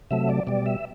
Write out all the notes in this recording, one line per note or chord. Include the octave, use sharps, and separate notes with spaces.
C3 F#3 A3 E5
D5
B2 G3 D5
E5